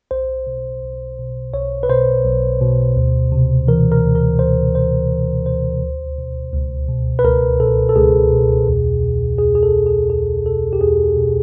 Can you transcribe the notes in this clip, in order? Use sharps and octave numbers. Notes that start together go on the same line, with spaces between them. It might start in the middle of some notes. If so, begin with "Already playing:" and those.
B1 C5
B2
B1
B2
B1 C#5
B4
B2 C5
B1
B2
D2
C3
E3 A#4
A#4
D2
A#4
D2 C5
C3 C5
E3
D2 C5
C#2
B2
C#2
B2
B4
C#2 A#4
B2 A4
A4
C#2 G#4
B2
E2
B2
E2 G#4
G#4
A4
B2
G#4
E2 G#4
B2 A4
G4
E2 G#4
B2